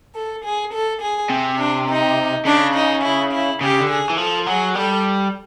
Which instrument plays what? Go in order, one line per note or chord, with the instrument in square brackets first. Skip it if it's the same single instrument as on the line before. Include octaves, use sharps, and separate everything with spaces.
[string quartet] A4
G#4
A4
G#4
[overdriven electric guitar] C3
[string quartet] D4
D#4
[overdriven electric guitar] C#3 [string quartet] D4
[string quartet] D#4
E4
E4
[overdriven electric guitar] C#3 [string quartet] G4
[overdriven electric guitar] D3
[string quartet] G#4
[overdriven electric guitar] E3
[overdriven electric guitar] F3 [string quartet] A4
[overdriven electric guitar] F#3 [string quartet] G#4
[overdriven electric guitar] G3 [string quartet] A4